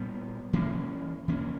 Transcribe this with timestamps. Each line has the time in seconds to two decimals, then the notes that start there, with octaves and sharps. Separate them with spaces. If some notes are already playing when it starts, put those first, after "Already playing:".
Already playing: A#2 G3 B3
0.53 E3 A#3 C#4
1.28 E3 A#3 C#4